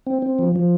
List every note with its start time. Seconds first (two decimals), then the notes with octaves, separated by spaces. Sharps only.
0.07 C4
0.22 C4
0.39 F3
0.56 F3